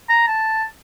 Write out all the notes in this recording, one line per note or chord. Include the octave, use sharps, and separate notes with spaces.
A#5
A5